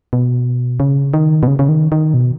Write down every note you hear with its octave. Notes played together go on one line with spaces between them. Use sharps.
B2
C#3
D#3
B2
C#3
C#3
D#3
D#3
B2